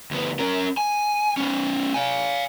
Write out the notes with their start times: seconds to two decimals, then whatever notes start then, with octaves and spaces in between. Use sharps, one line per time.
0.11 D2 B3
0.39 C#4 A#4
0.77 G#5
1.37 B3 C#4
1.94 F5 G#5